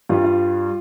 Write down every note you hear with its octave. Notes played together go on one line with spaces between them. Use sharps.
G2 G3 F4
F4